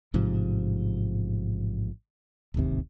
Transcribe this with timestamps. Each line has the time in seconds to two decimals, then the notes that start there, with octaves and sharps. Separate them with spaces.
0.14 A1 G#2 C3 F3
2.54 D1 G#1 D#2 C3